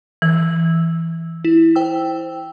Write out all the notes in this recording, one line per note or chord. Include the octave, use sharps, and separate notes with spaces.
E3 E6
E4
C5 G5 E6